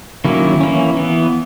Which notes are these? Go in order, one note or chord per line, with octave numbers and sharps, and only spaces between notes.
D#3 F#3 A#3 C#4 E4
E3 A#3 C#4
E3 B3